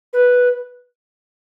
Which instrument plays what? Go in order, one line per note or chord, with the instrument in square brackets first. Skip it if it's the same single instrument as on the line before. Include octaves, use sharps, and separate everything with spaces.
[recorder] B4